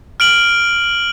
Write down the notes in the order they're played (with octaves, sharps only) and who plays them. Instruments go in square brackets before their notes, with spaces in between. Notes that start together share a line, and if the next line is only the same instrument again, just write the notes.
[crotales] F6 D7 F#7